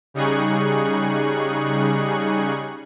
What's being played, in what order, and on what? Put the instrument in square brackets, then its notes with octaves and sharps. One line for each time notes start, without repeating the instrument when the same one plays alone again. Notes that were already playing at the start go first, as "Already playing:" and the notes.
[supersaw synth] C#3 G3 D#4 G#4 C#6 F#6